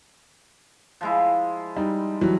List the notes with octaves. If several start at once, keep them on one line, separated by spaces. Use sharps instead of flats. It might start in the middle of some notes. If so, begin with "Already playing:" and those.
F3 G#3 E4
G3 D#4
E3 F#3 G3